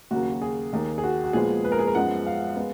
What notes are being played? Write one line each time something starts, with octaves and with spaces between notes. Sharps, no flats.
D#2 C#3 F#3 A#3 F#4
F#4
G#4
D#2 D#3 A#3
G#4
F#4
F#4
A#2 F3 G#3 B3 G#4
B4
A#4
G#4
A#4
F#2 F3 G#3 B3 F#5
F5
G#3 B3